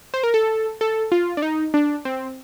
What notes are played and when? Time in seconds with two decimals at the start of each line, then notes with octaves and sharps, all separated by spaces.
0.14 C5
0.23 A#4
0.34 A4
0.81 A4
1.12 F4
1.37 D4
1.42 D#4
1.74 D4
2.05 C4